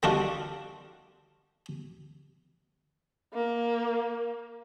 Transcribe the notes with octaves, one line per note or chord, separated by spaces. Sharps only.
D3 G3 D4 D#4 F4 F#4
A#3